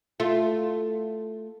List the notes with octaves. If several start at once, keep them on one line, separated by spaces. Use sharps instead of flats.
A3 F4